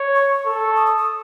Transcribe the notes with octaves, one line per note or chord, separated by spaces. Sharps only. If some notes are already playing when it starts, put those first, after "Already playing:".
Already playing: C#5
C#6
A4
D#6
D#6
D#6